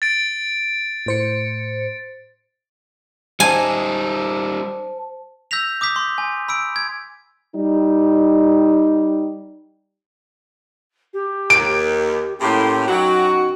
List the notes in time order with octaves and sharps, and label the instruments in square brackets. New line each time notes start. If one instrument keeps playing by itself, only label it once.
[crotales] A6 D7
[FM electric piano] A2 C5 C#7
[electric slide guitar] G3 D#4 [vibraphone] C5 A5 [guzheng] G#5
[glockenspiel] E6 G6 A#6 B6 F7
D6 D#6 G6 B6
C6
G#5
B5 E6 D7
G#6
[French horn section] G3 D#4
[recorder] G4
[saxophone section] D#2 [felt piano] D7
[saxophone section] A2 [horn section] A#3 C#4 G4 [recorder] C6
[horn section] F#2 D#4 F#4 [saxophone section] F#3 [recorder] G5